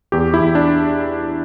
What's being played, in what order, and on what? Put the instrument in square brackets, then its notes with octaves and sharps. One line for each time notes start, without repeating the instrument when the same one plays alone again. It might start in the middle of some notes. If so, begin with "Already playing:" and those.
[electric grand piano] E2 G4
E4
E2
D4